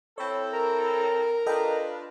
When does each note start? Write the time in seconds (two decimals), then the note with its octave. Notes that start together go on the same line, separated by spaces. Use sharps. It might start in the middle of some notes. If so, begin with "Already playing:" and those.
0.18 C4 E4 A4 C#5 B5
0.53 A#4 A#5
1.46 D4 F4 A4 B4 D#5 G5